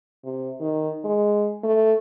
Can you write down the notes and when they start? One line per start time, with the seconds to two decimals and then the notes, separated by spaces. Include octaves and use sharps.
0.25 C3
0.61 D#3
1.05 G#3
1.64 A3